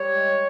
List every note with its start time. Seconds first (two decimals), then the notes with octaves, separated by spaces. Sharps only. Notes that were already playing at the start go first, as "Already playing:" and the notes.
Already playing: G3 C#5
0.10 G#3